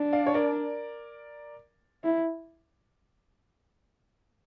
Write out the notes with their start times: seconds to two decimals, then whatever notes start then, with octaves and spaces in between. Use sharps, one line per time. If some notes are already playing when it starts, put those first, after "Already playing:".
Already playing: D4
0.13 D5 F5
0.27 C#5
0.34 A#4 D5
2.04 E4